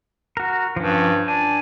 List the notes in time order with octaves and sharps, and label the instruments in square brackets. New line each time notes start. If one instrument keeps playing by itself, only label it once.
[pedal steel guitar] F#4 A#4
[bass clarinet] G2 [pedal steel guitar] F3 C#4
[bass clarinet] D4 [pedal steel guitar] G#5